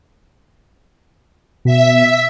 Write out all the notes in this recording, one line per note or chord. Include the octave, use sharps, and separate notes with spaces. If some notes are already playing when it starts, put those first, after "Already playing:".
B2 E5 B6